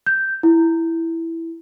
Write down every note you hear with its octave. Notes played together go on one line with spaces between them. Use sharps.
G6
E4